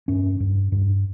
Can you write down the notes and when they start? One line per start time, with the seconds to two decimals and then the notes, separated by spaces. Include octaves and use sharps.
0.08 G2 C#4
0.40 G2
0.72 G2